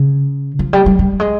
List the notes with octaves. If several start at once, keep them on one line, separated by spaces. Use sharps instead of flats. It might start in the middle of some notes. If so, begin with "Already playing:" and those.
Already playing: C#3
F3
G3
G3
G3
G#3